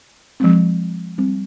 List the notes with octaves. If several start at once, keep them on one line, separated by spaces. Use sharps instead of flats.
F3 G#3 C4
G3 C4